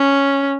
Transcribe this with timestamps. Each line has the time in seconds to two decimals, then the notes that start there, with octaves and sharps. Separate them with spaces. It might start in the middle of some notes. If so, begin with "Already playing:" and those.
Already playing: C#4